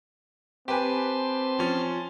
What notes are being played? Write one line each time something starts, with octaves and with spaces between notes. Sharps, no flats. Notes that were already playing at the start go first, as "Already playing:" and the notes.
C4 G4 B4 G#5 A5 C6
F3 C#4